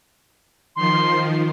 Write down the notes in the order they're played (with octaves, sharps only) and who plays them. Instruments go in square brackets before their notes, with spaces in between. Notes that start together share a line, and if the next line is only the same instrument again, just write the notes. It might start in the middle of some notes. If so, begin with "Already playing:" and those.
[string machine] D#3 F3 [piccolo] C6